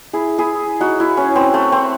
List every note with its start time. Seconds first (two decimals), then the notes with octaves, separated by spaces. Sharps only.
0.13 E4 G#4
0.38 E4 G#4
0.80 D#4 F#4
1.00 E4
1.17 C#4
1.36 C4
1.54 A3
1.72 C4